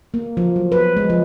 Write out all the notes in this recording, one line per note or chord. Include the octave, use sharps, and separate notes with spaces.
A#3
F3
F#3
B4
G#3
F3